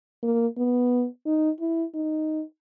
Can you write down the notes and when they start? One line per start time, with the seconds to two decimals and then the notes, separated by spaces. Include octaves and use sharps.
0.23 A#3
0.58 B3
1.26 D#4
1.60 E4
1.95 D#4